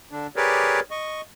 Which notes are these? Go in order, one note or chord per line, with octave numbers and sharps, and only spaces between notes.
D3 D4
G4 G#4 A#4 B4 C#5 D5
D#5 C#6